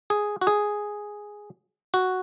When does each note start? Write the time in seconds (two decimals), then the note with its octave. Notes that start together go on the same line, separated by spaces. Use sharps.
0.10 G#4
0.41 F#4
0.47 G#4
1.94 F#4